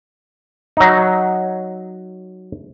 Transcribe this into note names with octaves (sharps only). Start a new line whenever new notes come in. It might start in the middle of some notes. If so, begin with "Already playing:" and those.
F#3 D#4